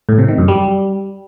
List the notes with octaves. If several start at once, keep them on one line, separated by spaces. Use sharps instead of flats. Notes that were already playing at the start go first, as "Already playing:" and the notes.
A2
C3
D#3
F#2
G3